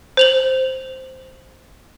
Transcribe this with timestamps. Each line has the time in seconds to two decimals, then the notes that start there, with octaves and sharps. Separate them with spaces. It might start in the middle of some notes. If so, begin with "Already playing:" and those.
0.17 C5 F7 F#7